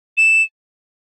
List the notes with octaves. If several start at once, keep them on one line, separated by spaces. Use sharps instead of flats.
E7